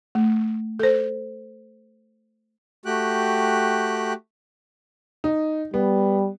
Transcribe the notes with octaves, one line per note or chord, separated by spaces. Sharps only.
A3
A4 C5
A3 F#4 G4 G5 F#6
D#4
G3 B3